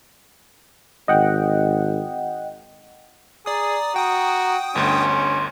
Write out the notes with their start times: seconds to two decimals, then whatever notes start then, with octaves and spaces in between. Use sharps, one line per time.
1.08 G#1 D#5 F#5 G5
3.46 G#4 D5 A#5 D#6
3.96 F#4 G5 D#6
4.76 G1 D2 C#4 C6